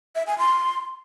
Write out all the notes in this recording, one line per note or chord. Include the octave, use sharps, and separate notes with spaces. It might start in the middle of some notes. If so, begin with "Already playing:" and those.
E5
G#5
C6